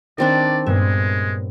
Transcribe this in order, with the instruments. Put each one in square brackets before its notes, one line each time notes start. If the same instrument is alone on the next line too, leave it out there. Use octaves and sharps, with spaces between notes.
[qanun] D#3 C4 D4 [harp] C#5 A5 [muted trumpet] D5
[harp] G2 A#2 B3 [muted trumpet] G#3 [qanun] E5